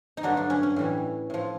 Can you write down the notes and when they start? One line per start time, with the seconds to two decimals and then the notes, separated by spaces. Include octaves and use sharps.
0.17 D#4
0.23 G2 D3 F#3 D4
0.37 D4
0.50 C#4
0.63 C#4
0.76 A2 E3 G3
1.30 A2 F3